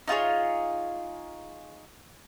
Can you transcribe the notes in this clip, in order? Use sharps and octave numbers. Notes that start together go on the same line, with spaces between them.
D#4 F4 G#4 C#5